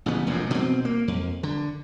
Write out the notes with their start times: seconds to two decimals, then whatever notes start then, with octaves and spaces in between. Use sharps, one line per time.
0.06 A1 C#3 B3
0.27 F1 A#1 F#2 A2
0.51 B2 B3 C4
0.85 A#3
1.08 F2
1.43 D3